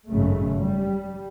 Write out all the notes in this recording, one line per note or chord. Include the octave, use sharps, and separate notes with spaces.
G#1 F#2 C#3 A3
G3